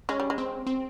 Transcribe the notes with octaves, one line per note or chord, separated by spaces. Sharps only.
G#3 C#4
G3
G#3
C4
C4